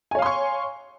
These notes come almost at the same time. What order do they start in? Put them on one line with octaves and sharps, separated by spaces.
G#5 C#5 F5 C6 C#6